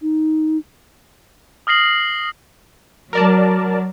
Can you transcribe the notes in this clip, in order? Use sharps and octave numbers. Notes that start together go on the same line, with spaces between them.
D#4
D#6 F6 A#6 C7 F#7
F#3 A#4 D5 A5